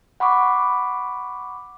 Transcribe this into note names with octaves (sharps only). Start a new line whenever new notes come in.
F#5 B5 C#6 D6